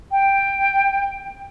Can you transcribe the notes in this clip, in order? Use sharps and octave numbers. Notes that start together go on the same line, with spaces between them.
G5